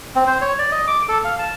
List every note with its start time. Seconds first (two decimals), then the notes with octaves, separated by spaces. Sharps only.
0.15 C4
0.27 C5
0.41 C#5
0.59 D5
0.72 D#5
0.87 D6
1.08 A4
1.25 F5
1.39 A5